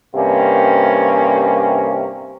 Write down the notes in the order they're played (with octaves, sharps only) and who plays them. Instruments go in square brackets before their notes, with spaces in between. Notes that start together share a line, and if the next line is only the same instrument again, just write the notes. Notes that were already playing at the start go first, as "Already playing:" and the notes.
[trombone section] G2 C3 A#3 C#4